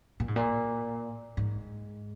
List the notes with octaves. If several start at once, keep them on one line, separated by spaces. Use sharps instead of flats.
A#2
G#2
A#2
G#2